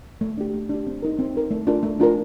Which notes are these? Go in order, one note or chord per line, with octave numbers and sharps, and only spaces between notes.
A3
D4 G4
A3
D4 G4
C4
D#4 A#4
C4
D#4 A#4
A3
D4 F4 A#4
A3
D4 F4 A#4